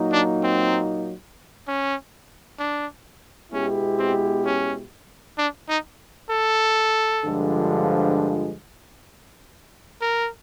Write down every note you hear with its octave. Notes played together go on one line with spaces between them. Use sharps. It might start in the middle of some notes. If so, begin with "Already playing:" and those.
Already playing: A#2 F#3 A#3 D#4
D4
C4
C#4
D4
B2 G#3 B3 C#4 E4 G4
C4
C#4
D4
D#4
A4
G2 D3 F3 G#3
A#4